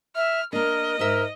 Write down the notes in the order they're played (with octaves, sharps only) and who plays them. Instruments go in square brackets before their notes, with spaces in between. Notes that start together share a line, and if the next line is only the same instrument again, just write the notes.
[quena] E5 [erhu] F6
[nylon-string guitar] A#3 D4 [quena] A#4 [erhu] D#5
[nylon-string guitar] G#2 E5 [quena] A#4